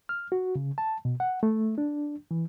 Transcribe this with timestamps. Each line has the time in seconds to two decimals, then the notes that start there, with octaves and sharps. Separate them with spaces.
0.09 F6
0.32 F#4
0.56 C#3
0.78 A5
1.05 B2
1.20 F#5
1.43 A3
1.78 D4
2.31 E3